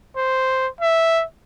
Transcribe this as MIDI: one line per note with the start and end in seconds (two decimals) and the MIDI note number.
0.16 0.68 72
0.80 1.23 76